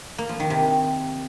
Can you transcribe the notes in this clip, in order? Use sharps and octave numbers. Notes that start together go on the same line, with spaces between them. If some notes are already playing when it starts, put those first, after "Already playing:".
A#3
F3
D#3
C3